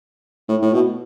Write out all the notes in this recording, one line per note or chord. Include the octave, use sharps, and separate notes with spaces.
A2
A2
B2